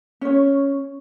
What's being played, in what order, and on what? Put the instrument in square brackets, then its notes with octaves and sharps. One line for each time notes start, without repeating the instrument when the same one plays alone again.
[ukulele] C#4 C#5